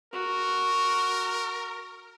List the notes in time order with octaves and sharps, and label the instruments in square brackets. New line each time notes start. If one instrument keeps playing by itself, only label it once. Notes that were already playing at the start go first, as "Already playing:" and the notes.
[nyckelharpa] F#4 [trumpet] A#4